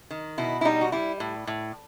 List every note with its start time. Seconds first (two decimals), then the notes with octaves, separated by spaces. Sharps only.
0.11 D#3
0.38 B2 E4
0.61 E4
0.65 G3 D#4
0.81 F#4
0.92 G3 E4
1.20 A2
1.47 A2